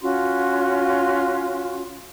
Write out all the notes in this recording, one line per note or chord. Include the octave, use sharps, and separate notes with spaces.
C#4 F4 F#4 C6